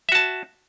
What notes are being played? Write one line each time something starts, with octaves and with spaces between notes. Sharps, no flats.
F#4 E5 A5